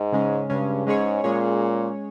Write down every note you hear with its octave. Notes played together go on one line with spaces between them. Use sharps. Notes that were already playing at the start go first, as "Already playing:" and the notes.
Already playing: G#2
C#3 G#3 C#4
G2 C#3 G#3 C#4
G#2 G#3 C#4 G#4 C#5
A#2 G#3 C#4 G#4 C#5